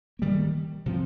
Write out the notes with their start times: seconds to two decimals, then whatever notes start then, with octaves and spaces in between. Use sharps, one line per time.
0.19 D#3 G3 A#3
0.86 C3 F3 C4